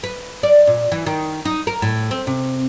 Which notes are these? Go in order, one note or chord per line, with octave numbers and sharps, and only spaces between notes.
B4
D5
A#2
E3
D#3
D#4
A#4
A2
C4
C3